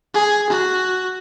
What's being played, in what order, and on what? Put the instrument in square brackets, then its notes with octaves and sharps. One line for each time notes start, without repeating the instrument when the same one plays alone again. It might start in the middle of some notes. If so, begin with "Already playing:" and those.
[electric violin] G#4
F#4